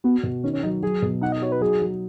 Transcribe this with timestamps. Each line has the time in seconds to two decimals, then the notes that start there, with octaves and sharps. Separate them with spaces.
0.04 B3 F#4
0.23 B2
0.43 D#3 C#4
0.53 C#4
0.63 F#3 D#4
0.82 F#3 G#4
1.02 B2
1.21 D#4 F#5
1.32 D#5
1.42 F#4 C#5
1.52 B4
1.61 F#3 G#4
1.82 F#3